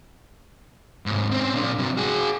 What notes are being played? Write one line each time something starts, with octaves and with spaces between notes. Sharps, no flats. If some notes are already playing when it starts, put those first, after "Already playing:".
G#2 C3
C4 C#4
A#2 D4
C3 F#3
F#4 G#4